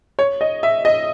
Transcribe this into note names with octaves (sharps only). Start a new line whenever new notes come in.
C#5
D#5
E5
D#5